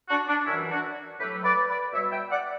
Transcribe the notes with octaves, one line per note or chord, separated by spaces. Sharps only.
D4 F#4
D4
F#2 E3 G3 C#4 E4
D4 F#4
A2 F#3 A3 G4 B4
B4 D5
B4 D5
B2 G3 C#5 E5
E5 G5
D5 F#5